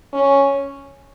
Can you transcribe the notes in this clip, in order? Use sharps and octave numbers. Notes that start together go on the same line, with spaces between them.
C#4